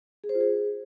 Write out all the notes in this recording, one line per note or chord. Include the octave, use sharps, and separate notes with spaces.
G#4
C5
F4
G#4